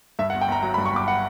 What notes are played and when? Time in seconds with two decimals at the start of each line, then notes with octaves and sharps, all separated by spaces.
0.19 G2 E5
0.30 F#5
0.34 G1
0.41 G5
0.48 G1 A#5
0.63 F#3 A#5
0.74 B5
0.78 G2
0.86 C#6
0.93 G1 D6
1.08 F#5